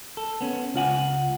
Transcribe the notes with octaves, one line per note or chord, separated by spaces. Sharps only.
A4
B3 C#4
C#2 F4 F#5 G#5